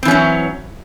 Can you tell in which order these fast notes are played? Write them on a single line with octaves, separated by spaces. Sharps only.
C4 E3 C#4 F#3